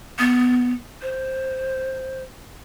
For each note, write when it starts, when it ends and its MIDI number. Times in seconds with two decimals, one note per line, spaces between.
0.19 0.73 59
1.02 2.23 72